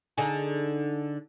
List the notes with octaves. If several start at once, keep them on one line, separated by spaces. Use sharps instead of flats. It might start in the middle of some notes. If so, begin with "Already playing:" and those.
D3 D#4 G#4